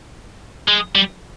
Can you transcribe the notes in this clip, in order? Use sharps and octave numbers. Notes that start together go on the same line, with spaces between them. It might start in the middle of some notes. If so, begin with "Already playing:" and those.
G#3
G3